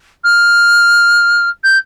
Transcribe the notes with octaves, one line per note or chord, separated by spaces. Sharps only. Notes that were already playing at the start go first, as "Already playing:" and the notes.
F6
G6